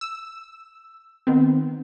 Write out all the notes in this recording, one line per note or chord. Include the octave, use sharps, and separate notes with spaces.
E6
D#3 B3 C4